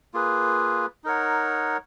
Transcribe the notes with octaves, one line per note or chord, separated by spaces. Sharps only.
A#3 F4 G#4 B4
D#4 A#4 C#5 F#5